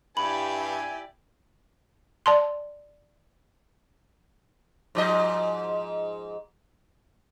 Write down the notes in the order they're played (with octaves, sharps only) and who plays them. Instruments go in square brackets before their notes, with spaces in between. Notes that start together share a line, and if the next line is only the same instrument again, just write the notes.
[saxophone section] G2 [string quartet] E4 G4 D5 [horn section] G#5 [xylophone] B5
[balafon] D5 A5 C6
[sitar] G#2 F3 D#5